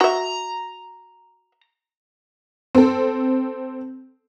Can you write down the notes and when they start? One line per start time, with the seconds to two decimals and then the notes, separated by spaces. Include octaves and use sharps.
0.01 F#4 E5 A#5
2.75 C4 A4